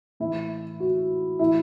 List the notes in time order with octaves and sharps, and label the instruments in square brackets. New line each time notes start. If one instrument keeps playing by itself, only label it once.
[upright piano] A2 E3 E4
F#4
A2 E3 E4